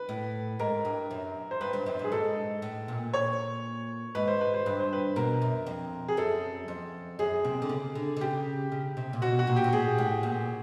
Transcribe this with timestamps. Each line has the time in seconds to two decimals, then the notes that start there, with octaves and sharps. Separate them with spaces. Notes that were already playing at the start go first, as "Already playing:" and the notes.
Already playing: B4
0.09 A2
0.59 G#2 A#4
0.85 G2
1.11 F#2
1.51 C5
1.61 G2 B4
1.73 G2
1.86 F#2
1.99 G2 G#4
2.12 G#2 A4
2.62 A2
2.88 A#2
3.13 C#5
4.15 G#2 B4
4.28 C5
4.41 B4
4.54 C5
4.66 G2 B4
4.80 C5
4.93 B4
5.16 B2 A#4
5.42 F#2
5.66 F2
6.08 G#4
6.17 F#2 A4
6.68 F2
7.19 F#2 G#4
7.45 C3
7.62 D3
7.69 C#3
7.95 D3
8.17 D3
8.21 C#3 G4
8.72 C#3
8.97 C3
9.13 A#2
9.22 B2 F#4
9.39 F#4
9.47 A#2
9.56 G4
9.64 A#2
9.73 A2 G#4
9.98 A2
10.23 A#2